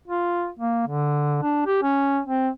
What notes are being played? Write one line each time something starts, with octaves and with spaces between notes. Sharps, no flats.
F4
A#3
D3
D4
G4
C#4
C4